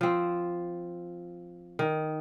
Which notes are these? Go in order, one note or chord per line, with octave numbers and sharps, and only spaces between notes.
F3 C4
D#3